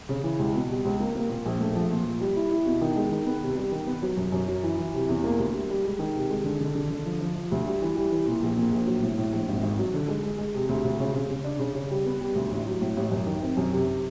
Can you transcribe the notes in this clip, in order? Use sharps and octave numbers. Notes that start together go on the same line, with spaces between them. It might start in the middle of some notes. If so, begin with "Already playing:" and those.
C#3
E3
C#2
B2
G3
C#2
A#3
A#3
A#2
A#1
A3
F3
A#2
F3
G3
E4
E4
B2
D#3
G#3
D#3
B3
C3
G3
D#3
B3
F#3
F#2
F#2
F#3
E3
E3
C3
E2
A#3
D2
G3
G3
G#3
D#3
C3
G#3
D3
D3
D3
D3
F3
F3
F3
D2
G3
E3
G3
E3
A#2
A#1
A#2
A#1
F#3
A2
A2
A#1
G#1
G#1
F#3
D3
G#3
G#3
G#3
C3
D2
D2
C#3
C#3
C#3
D4
C#3
C#3
G3
B3
G3
D2
A1
F#3
A2
A1
F#2
D#3
C4
F#2
C3